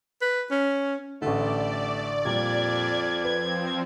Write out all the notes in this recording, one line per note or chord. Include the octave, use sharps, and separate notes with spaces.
B4
C#4
A1 D3 A3 D5
F2 A#2 G3 G#6
F3 C4 B4 G#6